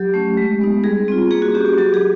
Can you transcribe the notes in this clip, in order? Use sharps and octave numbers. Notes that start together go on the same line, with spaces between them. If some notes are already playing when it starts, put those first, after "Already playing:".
Already playing: F#3 G4
A3 C#4
G#3
B3 D#4
G3 G#4
C4 F4
A#3 G#4
F#4
C#4 F#4 G4
F#4
F#3 G4
G#4